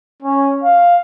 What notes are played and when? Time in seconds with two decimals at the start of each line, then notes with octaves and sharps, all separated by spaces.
0.23 C#4
0.63 F5